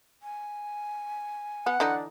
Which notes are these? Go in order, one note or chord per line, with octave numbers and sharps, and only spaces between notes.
G#5
B3 F#5
D3 E3 D4 D#4